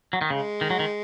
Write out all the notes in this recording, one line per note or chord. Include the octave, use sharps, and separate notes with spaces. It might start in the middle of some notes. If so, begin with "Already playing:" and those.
F#3
D#3
C#3 G#3
D#3
F#3
D#3